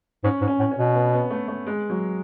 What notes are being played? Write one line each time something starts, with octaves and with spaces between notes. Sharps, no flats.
G#2 C#4
G#2
C#4
A2
C#4
B2
B3
B3
A3
A3
G#3
F#3